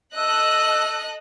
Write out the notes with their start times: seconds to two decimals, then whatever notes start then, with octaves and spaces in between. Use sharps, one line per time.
0.17 A4 D#5 E5 F#6